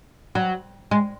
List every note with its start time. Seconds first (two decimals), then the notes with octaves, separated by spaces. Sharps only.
0.35 F#3
0.91 G#3